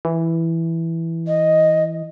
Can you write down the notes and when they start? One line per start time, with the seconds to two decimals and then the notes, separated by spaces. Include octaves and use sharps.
0.05 E3
1.27 D#5